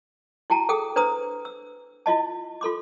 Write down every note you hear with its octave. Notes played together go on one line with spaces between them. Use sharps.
E4 F#4 G5 A5 A#5
G#4 A4 G5 D#6
D4 B4 C5 A#5 D#6
E6
E4 F4 D#5 A5
F4 A4 C6 D6